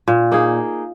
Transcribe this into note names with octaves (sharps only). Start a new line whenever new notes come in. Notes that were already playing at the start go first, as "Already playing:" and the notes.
A#2
A#3 D#4 G#4